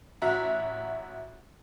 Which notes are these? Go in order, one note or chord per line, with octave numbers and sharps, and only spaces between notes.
A1 F#4 E5 A#5 F#6